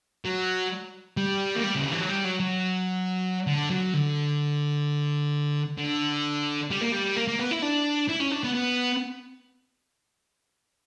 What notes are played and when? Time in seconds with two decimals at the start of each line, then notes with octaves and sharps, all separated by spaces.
0.25 F#3
1.17 G3
1.56 A#3
1.63 G3
1.75 C#3
1.83 D3
1.91 E3
2.01 F#3
2.09 G3
2.24 F#3
2.40 F#3
3.47 D3
3.70 F#3
3.94 D3
5.78 D3
6.70 G3
6.81 A#3
6.92 G3
7.16 A#3
7.28 A#3
7.39 B3
7.51 E4
7.62 D4
8.09 E4
8.20 C#4
8.31 D4
8.43 B3
8.54 B3